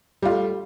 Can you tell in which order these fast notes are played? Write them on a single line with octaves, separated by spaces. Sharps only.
G3 F4 A3